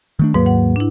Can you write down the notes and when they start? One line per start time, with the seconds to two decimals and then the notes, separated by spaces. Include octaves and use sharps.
0.19 D#3 A3 D4
0.34 D#2 G#2 F#3 A#3 B4
0.46 F#5
0.76 D4 E4